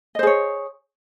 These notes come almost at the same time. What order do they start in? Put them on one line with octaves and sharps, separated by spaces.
D#5 C5 G#4 C#5